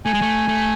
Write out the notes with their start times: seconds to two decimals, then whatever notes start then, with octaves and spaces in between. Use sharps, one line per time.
0.05 A3 G#5
0.14 G#3
0.21 A3
0.48 A3